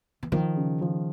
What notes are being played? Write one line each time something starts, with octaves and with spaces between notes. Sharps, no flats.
E3
D#3 F3
C#3
F3